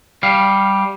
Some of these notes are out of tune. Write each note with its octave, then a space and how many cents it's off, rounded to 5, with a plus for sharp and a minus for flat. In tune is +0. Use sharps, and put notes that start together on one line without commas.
G3 -5 F5 +0